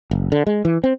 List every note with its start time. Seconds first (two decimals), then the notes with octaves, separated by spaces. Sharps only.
0.11 F#1
0.32 D3
0.47 G#3
0.65 E3
0.84 C4